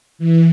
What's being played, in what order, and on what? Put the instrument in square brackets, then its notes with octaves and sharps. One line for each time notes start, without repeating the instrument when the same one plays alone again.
[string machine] E3